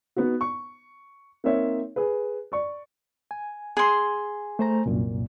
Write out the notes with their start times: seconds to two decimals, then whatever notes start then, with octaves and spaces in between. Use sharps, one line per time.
0.16 B3 D#4 F#4
0.41 C#6
1.44 A#3 C4 D#4 A#4 C#5 E5
1.96 G#4 B4
2.52 D5 C#6
3.31 G#5
3.77 G#4 C6
4.59 A3 C5 A#5
4.86 C2 F#2 A#2